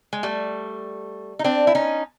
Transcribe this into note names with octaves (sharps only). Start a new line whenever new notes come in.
G#3
G3 A3
D#4
C4 D4
E4
C#4 D#4